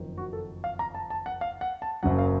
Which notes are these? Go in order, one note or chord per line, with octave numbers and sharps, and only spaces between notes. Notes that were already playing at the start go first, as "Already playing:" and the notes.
Already playing: F#1 F2 D#3
F#4
A4
F5
A#5
A5
A5
F#5
F5
F#5
A5
F#1 F#2 C#3 F#3 F#5
F5